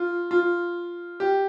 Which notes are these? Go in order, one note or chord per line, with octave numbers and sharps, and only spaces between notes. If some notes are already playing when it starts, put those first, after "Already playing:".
Already playing: F4
F4
G4